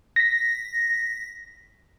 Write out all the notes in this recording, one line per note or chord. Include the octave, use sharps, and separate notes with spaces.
A#6 B6